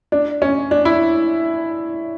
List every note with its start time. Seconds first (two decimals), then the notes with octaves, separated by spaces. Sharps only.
0.12 D4
0.42 C#4
0.71 D4
0.85 E4